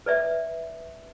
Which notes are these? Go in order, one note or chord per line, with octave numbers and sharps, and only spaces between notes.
B4 D5 E5